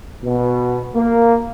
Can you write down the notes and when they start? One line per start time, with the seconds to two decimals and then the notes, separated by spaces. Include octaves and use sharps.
0.23 B2
0.95 A#3